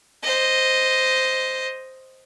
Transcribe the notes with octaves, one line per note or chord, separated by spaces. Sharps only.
C5 D#5